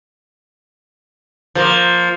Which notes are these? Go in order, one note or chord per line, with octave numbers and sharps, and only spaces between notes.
F3 A#3